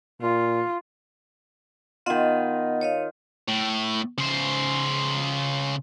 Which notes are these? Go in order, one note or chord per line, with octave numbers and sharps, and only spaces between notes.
A#2 F4
D#3 B3 F4 D#5 F#5
C#5 D#5 F5
A2
C#3 C5